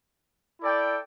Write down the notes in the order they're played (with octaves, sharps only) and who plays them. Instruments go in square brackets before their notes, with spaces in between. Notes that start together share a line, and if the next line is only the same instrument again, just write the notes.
[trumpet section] E4 A4 D5 G5